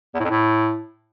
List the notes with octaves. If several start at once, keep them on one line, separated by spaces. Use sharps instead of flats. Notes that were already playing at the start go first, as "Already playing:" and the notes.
E2
A2
F2
A2